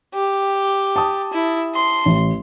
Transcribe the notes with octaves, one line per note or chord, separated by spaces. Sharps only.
G4
A5 D#6
E4
C6
A1